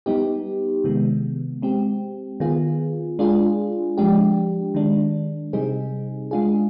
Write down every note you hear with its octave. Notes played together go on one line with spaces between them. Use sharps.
G3 B3 D#4 G4
C3 D#3 G#3 B3
G#3 C4 G4
D#3 B3 F4 G#4
G#3 D4 F4 G#4
F3 G#3 D4 G4
D#3 G#3 D4
C3 G3 C4 D#4 G#4
G#3 D4 F4 G#4